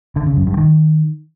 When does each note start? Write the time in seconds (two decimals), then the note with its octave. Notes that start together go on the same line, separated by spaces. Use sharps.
0.16 D3
0.26 C#3
0.37 F#2
0.47 G2
0.57 D#3